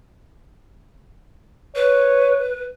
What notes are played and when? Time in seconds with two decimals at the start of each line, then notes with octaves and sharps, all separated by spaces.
1.76 B4 C#5